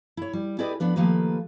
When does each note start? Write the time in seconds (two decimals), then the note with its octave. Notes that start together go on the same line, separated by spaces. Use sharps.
0.17 E4 C#5
0.33 G3
0.58 E4 G4 G#4 B4 D5 D#5
0.80 F3 B3 D4 B4
0.96 D#3 F3 A3 A#3 G4 B4